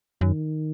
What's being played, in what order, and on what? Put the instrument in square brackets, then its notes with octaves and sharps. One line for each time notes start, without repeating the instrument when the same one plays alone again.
[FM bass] F#2 [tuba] D#3